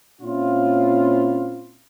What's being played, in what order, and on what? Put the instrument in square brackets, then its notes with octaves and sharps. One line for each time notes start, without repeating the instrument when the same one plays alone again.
[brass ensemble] A#2 C4 C#4 E4 F4